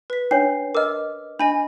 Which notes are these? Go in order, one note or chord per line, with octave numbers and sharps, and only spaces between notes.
B4 B6
C#4 D4 C#5 C7
A#4 D#5 D6 F6
D4 D#5 G#5 B5